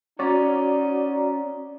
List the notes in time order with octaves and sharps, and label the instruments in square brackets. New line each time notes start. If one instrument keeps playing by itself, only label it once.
[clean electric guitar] C#4 C#5 [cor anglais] D#4 [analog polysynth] F#4 D5